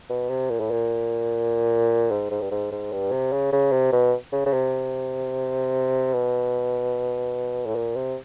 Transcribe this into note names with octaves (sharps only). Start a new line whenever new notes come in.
B2
C3
A#2
A2
A#2
G#2
G#2
G2
G#2
G#2
G2
C3
C#3
C#3
C3
B2
C#3
C#3
C3
B2
A2
A#2
C3